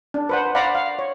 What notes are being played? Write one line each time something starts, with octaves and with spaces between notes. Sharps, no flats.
D4
B4 C5 F#5
C5 D5 F5 F#5 A#5 B5
F5
C#5